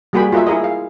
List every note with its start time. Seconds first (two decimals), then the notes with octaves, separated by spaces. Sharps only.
0.13 G3 A#3 F#4 G#4 G5 B5
0.32 F4 F#4 A#4 D#5 E5
0.47 E4 G#4 A#4 D#5
0.64 F5